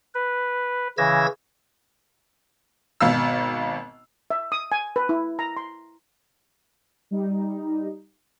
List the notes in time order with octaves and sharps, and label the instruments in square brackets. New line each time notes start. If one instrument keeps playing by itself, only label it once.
[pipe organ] B4
C#3 E3 E6 G#6 A#6
[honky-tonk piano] G#1 B2 F5 E6
[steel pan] E5
D#6
G#5
B4
E4
A#5
C6
[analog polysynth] G3 D#4